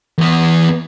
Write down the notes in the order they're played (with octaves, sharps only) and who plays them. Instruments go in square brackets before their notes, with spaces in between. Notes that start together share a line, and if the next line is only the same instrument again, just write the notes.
[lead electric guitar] E2 B3